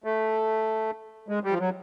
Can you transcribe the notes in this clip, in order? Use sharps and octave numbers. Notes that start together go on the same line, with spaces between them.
A3
G#3
G3
F3
F#3